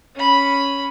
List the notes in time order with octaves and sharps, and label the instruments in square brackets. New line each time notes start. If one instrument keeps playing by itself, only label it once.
[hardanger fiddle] C#4 B5